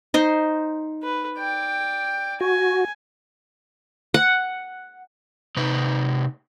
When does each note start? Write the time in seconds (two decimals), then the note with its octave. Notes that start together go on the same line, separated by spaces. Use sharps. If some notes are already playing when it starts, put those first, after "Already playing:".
0.14 D#4 C5
1.03 B4
1.38 D5 G5
2.41 F#4 G#5
4.14 F#5
5.57 C3 D#4 B4